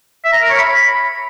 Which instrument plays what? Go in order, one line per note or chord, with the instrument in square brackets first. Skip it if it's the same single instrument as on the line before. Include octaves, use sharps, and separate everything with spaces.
[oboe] E5
A#5
A#4
C#5
B5